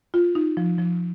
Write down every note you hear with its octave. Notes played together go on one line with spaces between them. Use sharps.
F4
D#4
F3
F3